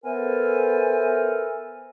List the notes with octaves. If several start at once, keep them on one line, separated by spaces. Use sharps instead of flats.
B3 A4 A#4 C5 E5 G#5